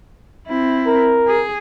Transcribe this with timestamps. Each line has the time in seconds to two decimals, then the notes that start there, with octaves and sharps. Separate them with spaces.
0.47 C4 E4
0.87 A#4
1.27 G#4